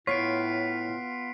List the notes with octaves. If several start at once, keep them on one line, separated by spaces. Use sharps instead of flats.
A2 B3 F4 C#5 B6 C7 D7